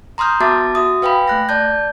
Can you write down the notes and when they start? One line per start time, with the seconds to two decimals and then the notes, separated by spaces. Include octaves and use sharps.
0.18 A#5 C6 D#6 F6 G6
0.40 B3 F#4 E5 A5 D6 A6
0.75 F#4 E5 D#6
1.02 B4 F5 G5 G#5 B5
1.28 A3 F#6 A#6
1.49 D5 A5 G6